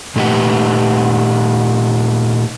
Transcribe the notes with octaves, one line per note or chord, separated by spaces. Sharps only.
A#2 A3 D#4 G4 B4 F#5